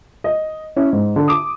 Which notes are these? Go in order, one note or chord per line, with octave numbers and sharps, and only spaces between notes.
D#5
C#4 E4
G#2
D3
D6 D#6